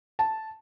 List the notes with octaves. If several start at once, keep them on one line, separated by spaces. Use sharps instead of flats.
A5